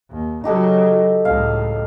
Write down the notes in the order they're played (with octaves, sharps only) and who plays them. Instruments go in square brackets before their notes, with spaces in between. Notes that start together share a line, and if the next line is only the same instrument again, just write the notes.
[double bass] D#2
[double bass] C#3 F#3 [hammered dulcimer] D#4 G4 A4
[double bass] C#2 A2 [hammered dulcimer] F5